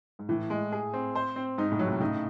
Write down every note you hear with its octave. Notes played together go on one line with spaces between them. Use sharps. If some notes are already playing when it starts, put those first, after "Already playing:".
G#2
A2 E3
G#3
G#4
C4
C5
C4
G#2 D#4
A2
F#3
G#2 C3
A2 C#3 D#4